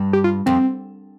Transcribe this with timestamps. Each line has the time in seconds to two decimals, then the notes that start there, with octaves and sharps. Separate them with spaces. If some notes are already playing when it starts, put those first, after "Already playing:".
Already playing: G2
0.13 G4
0.24 F4
0.46 F2 C4